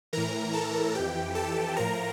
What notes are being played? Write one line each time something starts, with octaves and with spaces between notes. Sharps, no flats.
A2 E3 A#4 A#5
A4 A5
F2 E3 G4 G5
A4 A5
A2 F3 A#4 A#5